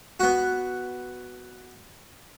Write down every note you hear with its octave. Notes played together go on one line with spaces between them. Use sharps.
B3 F#4